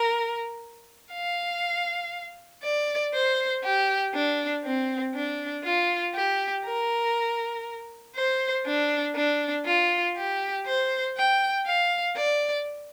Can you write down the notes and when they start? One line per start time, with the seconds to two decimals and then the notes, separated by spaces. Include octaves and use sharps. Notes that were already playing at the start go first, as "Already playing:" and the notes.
Already playing: A#4
1.12 F5
2.63 D5
3.14 C5
3.64 G4
4.14 D4
4.64 C4
5.15 D4
5.64 F4
6.14 G4
6.65 A#4
8.16 C5
8.66 D4
9.16 D4
9.66 F4
10.16 G4
10.66 C5
11.17 G5
11.66 F5
12.17 D5